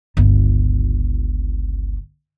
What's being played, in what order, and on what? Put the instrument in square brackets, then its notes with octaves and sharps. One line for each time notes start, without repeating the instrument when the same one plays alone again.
[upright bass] G1 C#2